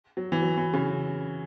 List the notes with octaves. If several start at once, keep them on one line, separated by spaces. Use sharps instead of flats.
F#3
E3
F#3
E3
C#3